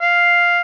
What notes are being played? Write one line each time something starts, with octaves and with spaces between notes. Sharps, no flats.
F5